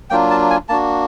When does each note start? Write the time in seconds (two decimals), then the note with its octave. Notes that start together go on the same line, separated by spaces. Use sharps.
0.10 F#3 A#3 D4 F4 G5
0.30 A5
0.50 G#5
0.69 A#3 D4 F#4 A5